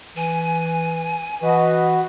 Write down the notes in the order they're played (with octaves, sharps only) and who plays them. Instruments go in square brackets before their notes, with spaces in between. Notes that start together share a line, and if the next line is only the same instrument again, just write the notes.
[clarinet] E3 [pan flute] G#5
[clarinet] E3 [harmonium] F#4 B4 [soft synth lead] D#5